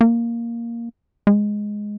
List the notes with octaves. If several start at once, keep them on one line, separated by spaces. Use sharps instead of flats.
A#3
G#3